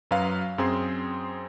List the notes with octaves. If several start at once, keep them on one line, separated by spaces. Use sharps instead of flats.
F#2 F#3 B4 F5
F#2 C4 G#4 C6